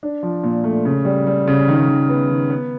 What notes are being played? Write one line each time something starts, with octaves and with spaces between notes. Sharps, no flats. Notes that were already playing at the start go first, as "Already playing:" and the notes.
D4
F3
A#2
A3
C#3
G3
G3
C#3
D#3
D#3
B3
D#3
B3